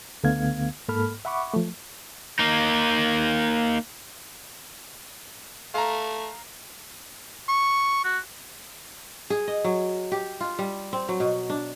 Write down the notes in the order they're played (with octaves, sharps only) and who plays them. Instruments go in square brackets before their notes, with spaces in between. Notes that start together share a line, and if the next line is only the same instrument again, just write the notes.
[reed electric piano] C#2 D3 A3 B3 F5 G#6
G#2 A#3 A4 B5 F6
E5 F#5 B5 C#6 D6
F3 A3
[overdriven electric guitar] A#3 D#4
[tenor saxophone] A3 [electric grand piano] F5 A#5
[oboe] C#6
F#4
[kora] G#4
D#5
F#3
G4
F4
G3
C4
F#3
B2
D4